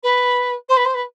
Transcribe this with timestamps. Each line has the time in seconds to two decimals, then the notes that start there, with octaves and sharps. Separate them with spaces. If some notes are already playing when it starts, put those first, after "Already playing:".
0.03 B4
0.69 C5
0.77 B4
0.85 C5
0.94 B4